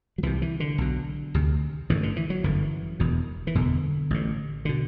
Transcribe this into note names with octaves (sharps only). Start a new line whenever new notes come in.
F#3
C2 C3 E3
E3
D3
B1 B2
D2 C3
A1 G2 D3 E3
D3
E3
F#3
G1 F#2 D3 E3
E1 E2 B2
E3
F#1 E2 B2 D3
A1 A2
B2 D3